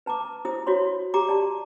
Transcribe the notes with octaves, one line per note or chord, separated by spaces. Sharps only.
B4 A5 A#5 D6
E4 C5 D#6
E4 F#4 C5 C#5 B5 C6
G4 A#5 D6
D5 A5 C6